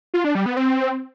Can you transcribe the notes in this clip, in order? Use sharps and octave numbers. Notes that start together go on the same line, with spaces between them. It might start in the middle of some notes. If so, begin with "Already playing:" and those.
F4
D4
G3
B3
C4